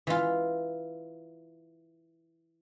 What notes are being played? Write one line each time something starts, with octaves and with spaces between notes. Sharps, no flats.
E3 F4